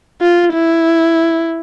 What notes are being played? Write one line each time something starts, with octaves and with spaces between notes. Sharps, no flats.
F4
E4